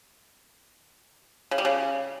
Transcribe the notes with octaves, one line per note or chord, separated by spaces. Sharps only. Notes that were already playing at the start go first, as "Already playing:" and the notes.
C#3
G3
C#3